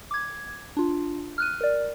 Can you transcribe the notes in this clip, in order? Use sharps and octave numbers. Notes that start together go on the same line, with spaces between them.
D6 G#6
D4 F4
F6 F#6 D#7
A#4 D5